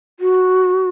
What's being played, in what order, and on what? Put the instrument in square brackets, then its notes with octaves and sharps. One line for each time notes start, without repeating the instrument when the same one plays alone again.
[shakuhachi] F#4